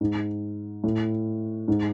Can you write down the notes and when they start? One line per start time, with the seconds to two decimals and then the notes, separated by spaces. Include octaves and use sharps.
0.01 G#2
0.84 A2
1.68 G#2